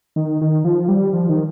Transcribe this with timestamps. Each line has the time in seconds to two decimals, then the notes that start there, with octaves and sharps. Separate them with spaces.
0.16 D#3
0.41 D#3
0.64 F3
0.88 G3
1.13 F3
1.29 D#3